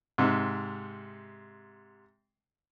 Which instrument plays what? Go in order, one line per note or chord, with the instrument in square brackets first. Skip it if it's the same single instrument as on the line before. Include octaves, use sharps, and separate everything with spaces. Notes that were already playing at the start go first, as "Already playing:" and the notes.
[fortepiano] G#2 C3